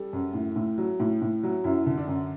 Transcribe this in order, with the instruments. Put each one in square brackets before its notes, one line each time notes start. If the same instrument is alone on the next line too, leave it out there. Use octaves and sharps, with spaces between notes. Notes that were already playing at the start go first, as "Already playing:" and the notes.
Already playing: [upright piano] G3 A4
F#2
A2
A2
F#3
A2
A2
F#3
F#2 E4
D3
D4
F#2